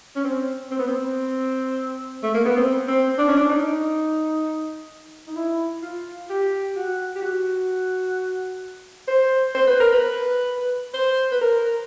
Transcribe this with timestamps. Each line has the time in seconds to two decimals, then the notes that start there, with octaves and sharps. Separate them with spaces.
0.16 C#4
0.24 C4
0.71 C4
0.79 B3
0.88 C4
2.23 A3
2.34 A#3
2.45 B3
2.57 C4
2.88 C4
3.18 D4
3.28 C#4
3.37 D4
3.50 D#4
5.27 D#4
5.36 E4
5.82 F4
6.30 G4
6.76 F#4
7.15 G4
7.22 F#4
9.08 C5
9.55 C5
9.67 B4
9.80 A#4
9.92 B4
10.94 C5
11.32 B4
11.41 A#4